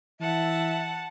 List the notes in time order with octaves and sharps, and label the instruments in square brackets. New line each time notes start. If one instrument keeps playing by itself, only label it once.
[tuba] E3 [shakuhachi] E5 [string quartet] F#5 A5